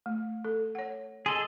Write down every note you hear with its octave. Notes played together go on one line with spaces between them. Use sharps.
A3
A4
C#5 F#5
G#4 A4 D#5 C6